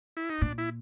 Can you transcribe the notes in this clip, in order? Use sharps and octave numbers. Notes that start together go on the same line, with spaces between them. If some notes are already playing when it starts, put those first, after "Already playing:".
E4
D#4
A#2 D4
E4